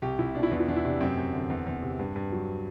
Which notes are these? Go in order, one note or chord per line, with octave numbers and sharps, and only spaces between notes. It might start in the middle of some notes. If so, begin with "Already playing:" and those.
C2 G4
C2 E4
B2 D4
E4
E2 D4
E4
E2 D4
E4
C3 D4
F#2 C4
F#2
D3
E2
E2
C3
G2
G2
F#3